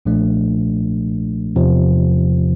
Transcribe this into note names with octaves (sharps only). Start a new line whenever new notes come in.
B1 A#2 F3 A3 D4
E2 C3 F3